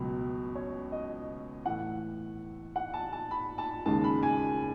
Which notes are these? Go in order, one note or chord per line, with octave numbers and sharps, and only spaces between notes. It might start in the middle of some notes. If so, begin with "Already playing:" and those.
Already playing: C#2 B2 F#3 A3
C#5
D#5
A2 E3 A3 F#5
F#5
A5
A5
B5
A5
D#2 C#3 G#3 A5
B5
G#5